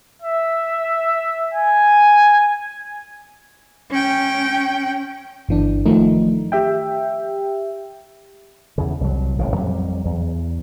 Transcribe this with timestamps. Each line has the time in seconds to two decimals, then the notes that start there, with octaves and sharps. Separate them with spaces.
0.22 E5
1.54 G#5
3.90 C#4 G5
5.49 G1 E3 D4
5.86 D#3 F3 A3 D#4
6.52 G4 E5 G5
8.78 E2 C#3
9.01 C2 F#3
9.39 G#1 A2 C#3
9.56 F2 F#3 G3
10.05 E2